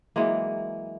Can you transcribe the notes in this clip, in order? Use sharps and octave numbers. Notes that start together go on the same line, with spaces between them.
E3 F#3 G#3 A#3